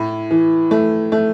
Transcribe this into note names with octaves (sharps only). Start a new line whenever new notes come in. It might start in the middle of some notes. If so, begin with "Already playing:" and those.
Already playing: A2
E3
A3
A3